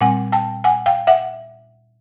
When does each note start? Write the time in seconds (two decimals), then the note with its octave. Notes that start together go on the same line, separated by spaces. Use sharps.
0.01 A#2 G3 C4 F#5 G#5
0.32 G5 A5
0.64 F#5 G#5
0.86 F5 G5
1.07 E5 F#5